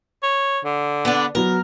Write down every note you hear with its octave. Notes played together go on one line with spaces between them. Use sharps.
C#5
D3
B3 D4
F#3 B3 A#4